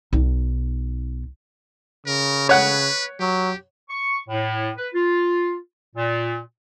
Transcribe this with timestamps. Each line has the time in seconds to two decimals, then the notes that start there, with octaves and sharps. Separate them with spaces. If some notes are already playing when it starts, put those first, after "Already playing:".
0.13 B1 D#4
2.07 C#3 A#4
2.49 B4 C#5 F#5
3.20 F#3 G4
3.89 C#6
4.29 A2
4.77 B4
4.94 F4
5.96 A#2